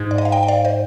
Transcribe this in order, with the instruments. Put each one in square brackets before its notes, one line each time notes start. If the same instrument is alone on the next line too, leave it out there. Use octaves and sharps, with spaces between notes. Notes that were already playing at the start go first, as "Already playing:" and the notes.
Already playing: [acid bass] G#2
[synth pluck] D5
D#5
F5
D#5 G5
G5
D5 F5
C5 D#5